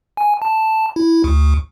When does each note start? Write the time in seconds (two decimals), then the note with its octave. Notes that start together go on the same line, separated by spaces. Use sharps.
0.17 G#5
0.42 A5
0.96 E4
1.24 D2